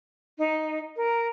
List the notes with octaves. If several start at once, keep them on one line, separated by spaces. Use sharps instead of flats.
D#4
A#4